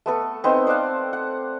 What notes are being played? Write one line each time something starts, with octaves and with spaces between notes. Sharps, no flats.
A3 B3 A4
B3 C4 D#4
C5 D5 F5 F#5
F#5